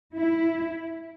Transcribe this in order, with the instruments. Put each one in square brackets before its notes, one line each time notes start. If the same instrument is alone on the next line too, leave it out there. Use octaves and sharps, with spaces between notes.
[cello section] E4